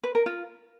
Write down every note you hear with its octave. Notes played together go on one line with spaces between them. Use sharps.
B4
A#4
F4